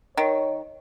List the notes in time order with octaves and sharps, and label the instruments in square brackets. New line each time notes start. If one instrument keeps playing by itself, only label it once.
[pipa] D#3 [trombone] C#5